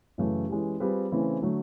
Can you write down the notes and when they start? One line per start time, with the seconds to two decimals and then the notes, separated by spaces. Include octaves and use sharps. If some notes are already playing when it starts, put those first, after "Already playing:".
0.18 F#2 C#3 E3 A3
0.49 E3 G#3 C#4 E4 G4
0.80 G3 C4 F4 G#4 B4
1.11 C#3 E3 A3 C4 E4
1.42 D3 F#3 A3